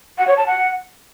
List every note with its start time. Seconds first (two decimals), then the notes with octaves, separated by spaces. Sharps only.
0.18 F#5
0.28 C#5
0.37 A5
0.47 F#5